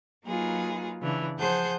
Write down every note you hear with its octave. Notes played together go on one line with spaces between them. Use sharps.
F#3 A#3 D#4 F4 G#4 B4
C#3 E3 D4
F3 G#4 C5 F#5 A5 G6